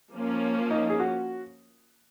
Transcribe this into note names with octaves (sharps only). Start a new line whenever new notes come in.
F3 A#3 C#4
D#4
G#4
F#4